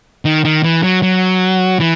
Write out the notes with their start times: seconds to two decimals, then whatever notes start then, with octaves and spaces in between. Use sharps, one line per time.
0.25 D#3
0.45 D#3
0.63 E3
0.83 F#3
1.03 F#3
1.80 E3